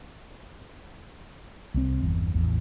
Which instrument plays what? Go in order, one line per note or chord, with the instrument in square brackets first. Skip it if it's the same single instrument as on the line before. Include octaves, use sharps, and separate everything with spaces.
[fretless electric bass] C2 E3 C4
G1 E2
A1 E2